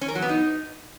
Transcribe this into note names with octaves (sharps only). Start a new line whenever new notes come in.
C#4
A#4
F#3
B3
D#4